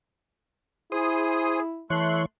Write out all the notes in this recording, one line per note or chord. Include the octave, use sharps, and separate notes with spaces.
E4 G#4 C5 D#6
E3 A3 C#5 C6 F#6